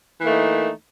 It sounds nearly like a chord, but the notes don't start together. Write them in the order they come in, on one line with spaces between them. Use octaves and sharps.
E3 A#3 A3 D#4